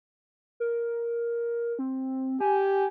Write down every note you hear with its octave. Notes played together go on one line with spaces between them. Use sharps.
A#4
C4
G4 G#5